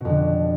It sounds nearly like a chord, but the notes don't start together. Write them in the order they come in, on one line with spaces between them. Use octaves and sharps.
B2 F2 D3